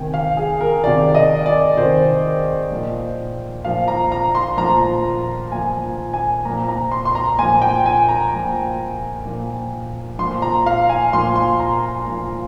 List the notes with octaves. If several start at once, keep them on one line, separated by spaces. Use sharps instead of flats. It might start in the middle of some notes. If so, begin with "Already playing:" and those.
Already playing: C3 D#3 G5 G#5
F5
G#4
A#4
C3 D#3 D5
D#5
D5
C3 D#3 C5
A#2 F3
A#2 F3 F5
A#5
A#5
C6
A#2 F3 A#5
A#2 F3 G#5
G#5
A#2 F3 A#5
A#5
C6
C6
A#5
A#2 F3 G#5
G5
G#5
A#5
A#2 F3
A#2 F3
A#2 F3 C6
A#5
F5
G#5
A#2 F3 C6
C6
A#5
A#2 F3